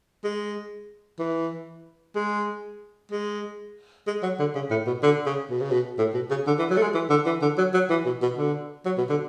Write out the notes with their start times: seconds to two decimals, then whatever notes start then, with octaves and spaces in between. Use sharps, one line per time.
0.24 G#3
1.19 E3
2.16 G#3
3.12 G#3
4.07 G#3
4.23 F#3
4.39 D3
4.55 C#3
4.71 A2
4.87 B2
5.03 D3
5.26 C#3
5.50 B2
5.61 C#3
5.71 B2
5.98 A2
6.14 B2
6.30 C#3
6.47 D3
6.59 E3
6.70 F#3
6.77 A3
6.82 G#3
6.94 E3
7.10 D3
7.26 E3
7.42 D3
7.58 F#3
7.74 F#3
7.90 E3
8.06 B2
8.22 B2
8.38 D3
8.86 F#3
8.98 B2
9.10 D3